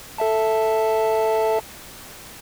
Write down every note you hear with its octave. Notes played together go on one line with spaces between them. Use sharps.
A4 E5 A5